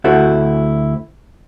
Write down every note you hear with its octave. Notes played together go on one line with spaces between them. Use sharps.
D2 E4 F#4 A4 C5